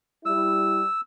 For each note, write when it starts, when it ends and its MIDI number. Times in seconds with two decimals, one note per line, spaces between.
0.25 0.82 55
0.25 0.82 64
0.25 1.01 88